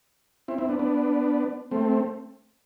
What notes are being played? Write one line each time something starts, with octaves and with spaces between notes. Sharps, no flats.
C4 E4
C4 E4
B3 D4
B3 D4
A3 C4